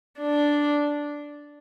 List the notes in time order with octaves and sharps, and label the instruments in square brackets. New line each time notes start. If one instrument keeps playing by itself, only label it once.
[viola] D4